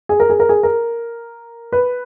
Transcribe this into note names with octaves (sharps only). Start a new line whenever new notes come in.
G#4
A#4
G#4
A#4
G#4
A#4
B4